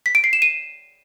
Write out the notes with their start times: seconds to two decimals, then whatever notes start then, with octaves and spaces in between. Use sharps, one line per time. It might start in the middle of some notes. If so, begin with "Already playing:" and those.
0.06 B6
0.15 D7
0.24 C7
0.33 E7
0.42 D#7